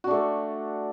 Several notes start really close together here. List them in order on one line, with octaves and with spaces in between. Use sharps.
F#4 D4 A3